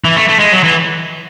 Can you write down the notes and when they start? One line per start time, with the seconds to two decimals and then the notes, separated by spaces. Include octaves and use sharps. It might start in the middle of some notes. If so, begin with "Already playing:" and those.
0.05 E3
0.17 A3
0.29 A3
0.39 G#3
0.52 F#3
0.64 E3